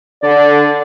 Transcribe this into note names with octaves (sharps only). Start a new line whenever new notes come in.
D3 D5